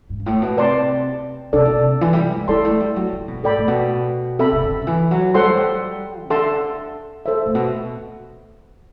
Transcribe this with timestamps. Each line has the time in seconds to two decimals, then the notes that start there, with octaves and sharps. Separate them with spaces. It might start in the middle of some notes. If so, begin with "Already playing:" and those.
0.10 G2
0.20 G2
0.26 A2
0.42 B2
0.57 C3 B4 D5 A5 C6
1.53 C3 D4 A4 D5
1.65 B2
1.78 C3
2.01 E3
2.13 G3
2.36 G3
2.48 G3 E4 A4 D5 A5 C6
2.65 A3
2.80 G3
2.96 F#3
3.13 D3
3.28 B2
3.44 A2 A4 D5 G5 B5
3.58 A2
3.68 B2
4.39 C3 A4 E5 B5
4.53 C3
4.63 D3
4.82 D3
4.87 E3
5.11 F#3
5.35 G3 A4 C5 F#5 C6
5.46 F#3
5.57 G3
6.24 C3
6.30 D3 A4 E5 A5 C6
7.26 A4 C5 E5
7.46 A2
7.55 B2